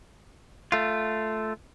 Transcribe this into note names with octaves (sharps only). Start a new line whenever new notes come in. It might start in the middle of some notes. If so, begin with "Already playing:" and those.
A3 F4